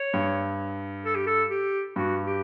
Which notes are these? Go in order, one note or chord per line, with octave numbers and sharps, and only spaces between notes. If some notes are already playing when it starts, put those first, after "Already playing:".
Already playing: C#5
G2
A4
G4
A4
G4
G2 F#4
G4